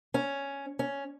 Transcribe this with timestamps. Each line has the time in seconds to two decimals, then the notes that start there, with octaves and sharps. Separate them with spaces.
0.14 C#4
0.79 C#4